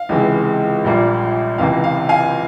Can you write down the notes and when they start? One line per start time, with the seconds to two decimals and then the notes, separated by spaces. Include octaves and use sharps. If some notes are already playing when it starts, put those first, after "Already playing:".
Already playing: F5
0.09 C#2 C3 E3 G#3
0.84 A#1 A#2 G3 A#3
1.58 C#2 C3 E3 A#3 F5
1.84 F5
2.09 F5 G#5